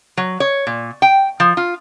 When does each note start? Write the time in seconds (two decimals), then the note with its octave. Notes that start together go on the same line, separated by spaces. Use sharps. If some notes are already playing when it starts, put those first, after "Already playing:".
0.17 F#3
0.40 C#5
0.67 A#2
1.02 G5
1.40 F3
1.57 F4